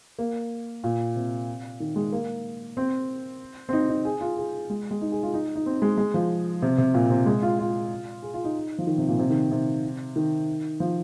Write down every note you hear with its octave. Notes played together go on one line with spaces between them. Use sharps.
A#3
A#2
C3
D#3
G#3
A#3
C4
C4
D#4
D#4
G#4
F4
G#4
G#3
G#3
D#4
G#4
F4
D#4
D#4
C4
G#3
G#3
F3
C3
C3
A#2
C3
G#3
F4
F4
G#4
F4
D#4
F3
D#3
C3
A#2
C3
D#3
C3
D#3
F3